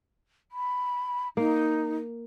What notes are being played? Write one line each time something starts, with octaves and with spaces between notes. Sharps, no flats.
B5
A#3 D#4